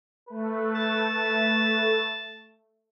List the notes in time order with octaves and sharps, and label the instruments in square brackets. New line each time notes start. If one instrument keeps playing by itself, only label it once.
[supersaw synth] A3 [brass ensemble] B4
[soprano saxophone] A5